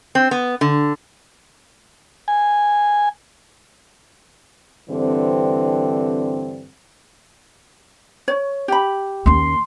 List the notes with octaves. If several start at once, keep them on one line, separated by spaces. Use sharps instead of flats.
C4
B3
D3
G#5
G2 D3 E3 C4
C#5
G4 B5
D#2 C#4 C6